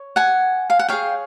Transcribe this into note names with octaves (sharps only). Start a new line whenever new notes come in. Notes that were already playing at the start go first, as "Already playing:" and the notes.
Already playing: C#5
F#5 G#5
F5
F#5
G#4 C#5 F5 G5